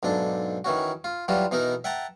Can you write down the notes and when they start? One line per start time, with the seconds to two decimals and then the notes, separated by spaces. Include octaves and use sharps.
0.03 B1 G#2 D4 A4
0.64 D#3 E3 C#4 F#4
1.04 F4
1.28 E3 F#3 G3 F4 F#4
1.51 B2 E3 B3 D#4 A#4
1.84 E5 F#5 G5 A5 A#5